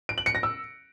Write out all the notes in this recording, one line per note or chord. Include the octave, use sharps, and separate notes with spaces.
D7
F#7
C#7
A#6
E6